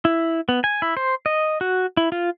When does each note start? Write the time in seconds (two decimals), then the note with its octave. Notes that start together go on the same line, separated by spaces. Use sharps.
0.05 E4
0.49 B3
0.64 G#5
0.82 E4
0.97 C5
1.26 D#5
1.61 F#4
1.97 E4
2.12 F4